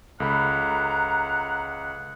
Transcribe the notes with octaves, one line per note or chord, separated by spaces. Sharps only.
C#2 A4 F#5 A#5 B5